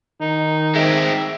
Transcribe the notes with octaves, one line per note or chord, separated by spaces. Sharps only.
D#3 D#4
G#3 C4 E5